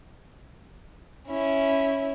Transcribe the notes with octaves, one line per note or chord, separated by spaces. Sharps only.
C#4 E4